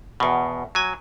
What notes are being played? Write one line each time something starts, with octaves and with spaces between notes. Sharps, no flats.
E2 B2
F#3 G#5